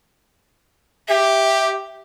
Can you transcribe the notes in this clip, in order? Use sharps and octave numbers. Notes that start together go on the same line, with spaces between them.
G4 E5